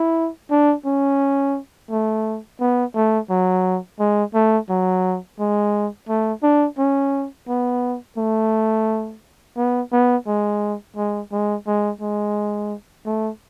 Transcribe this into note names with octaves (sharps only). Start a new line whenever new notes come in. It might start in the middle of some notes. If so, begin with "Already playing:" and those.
Already playing: E4
D4
C#4
A3
B3
A3
F#3
G#3
A3
F#3
G#3
A3
D4
C#4
B3
A3
B3
B3
G#3
G#3
G#3
G#3
G#3
A3